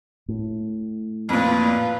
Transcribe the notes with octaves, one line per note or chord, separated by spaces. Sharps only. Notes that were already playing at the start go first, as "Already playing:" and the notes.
A2
F2 A#2 F4 B4